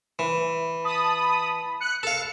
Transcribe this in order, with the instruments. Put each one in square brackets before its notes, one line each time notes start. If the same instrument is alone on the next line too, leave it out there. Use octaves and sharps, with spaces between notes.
[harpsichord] E3
[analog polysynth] A5 B5 D#6
F#6 C#7
[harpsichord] A4 F5 [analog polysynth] C#7